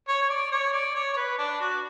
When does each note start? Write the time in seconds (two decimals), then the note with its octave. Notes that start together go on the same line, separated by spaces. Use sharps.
0.08 C#5
0.22 C#5
0.29 D5
0.52 C#5
0.73 D5
0.95 C#5
1.13 C#5
1.17 B4
1.38 D4
1.60 F#4